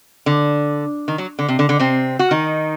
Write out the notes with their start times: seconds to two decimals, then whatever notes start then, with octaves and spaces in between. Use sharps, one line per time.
0.26 D3
1.08 D#3
1.18 F#3
1.39 D3
1.48 C3
1.59 D3
1.69 D3
1.80 C3 C4
2.19 F#4
2.31 D#3 D#4